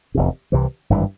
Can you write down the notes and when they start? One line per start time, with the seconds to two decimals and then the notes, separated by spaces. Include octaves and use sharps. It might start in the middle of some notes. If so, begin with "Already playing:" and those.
0.15 F1 E2 C3
0.52 C2 C3 E3
0.90 G#1 G2 E3